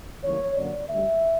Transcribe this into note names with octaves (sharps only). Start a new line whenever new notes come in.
C#2 C#3 E3 G3 A#3 C#5
F#2 D3 F#3 A#3 D5
D2 D3 G3 E5